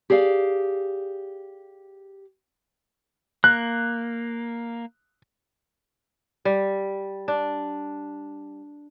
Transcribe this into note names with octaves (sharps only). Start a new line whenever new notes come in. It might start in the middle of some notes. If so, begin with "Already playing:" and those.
G4 G#4 D5 F5
A#3 F#6
G3
D4